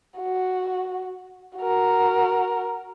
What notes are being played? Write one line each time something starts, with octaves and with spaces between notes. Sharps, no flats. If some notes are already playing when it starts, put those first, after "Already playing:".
F#4
F#4 A#4